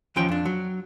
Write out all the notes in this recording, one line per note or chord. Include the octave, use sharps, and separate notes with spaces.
D#2 E3 F3 C#4 G5
F2 D4
F#3